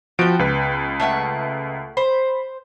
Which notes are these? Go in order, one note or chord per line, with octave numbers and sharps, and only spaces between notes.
F3 B3 F#4 G5 D7
C#2 B4
A3 E5 F#5
C5 B5